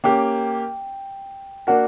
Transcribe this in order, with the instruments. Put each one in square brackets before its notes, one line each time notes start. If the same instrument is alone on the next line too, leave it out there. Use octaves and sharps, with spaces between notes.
[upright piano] A#3 C#4 G4 [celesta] G5
[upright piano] A#3 D4 F#4 A#4 [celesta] F#5